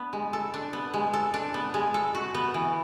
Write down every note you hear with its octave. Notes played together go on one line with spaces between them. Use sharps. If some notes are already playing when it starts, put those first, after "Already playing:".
Already playing: B3 D4
G#3
A4
D4
B3
G#3
A4
D4
B3
G#3
A4
F#4
B3
E3